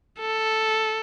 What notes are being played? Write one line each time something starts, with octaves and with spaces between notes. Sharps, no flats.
A4